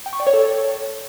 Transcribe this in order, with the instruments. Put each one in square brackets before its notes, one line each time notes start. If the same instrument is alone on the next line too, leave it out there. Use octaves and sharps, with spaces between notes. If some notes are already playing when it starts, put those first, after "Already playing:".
[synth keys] G5
C#6
D5
C#5
A4